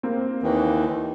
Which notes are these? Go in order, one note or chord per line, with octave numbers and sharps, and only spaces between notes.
A#3 C4
D#2 D#3 E3